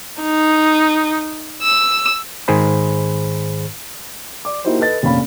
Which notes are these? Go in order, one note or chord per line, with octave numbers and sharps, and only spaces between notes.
D#4
E6
G#2 D#3 G#4 C5 B5
D5 D6
A#3 D#4 E4 F#4 G4 C5
A4 B4 D#5 A6
F1 A#2 C#4 F5 B5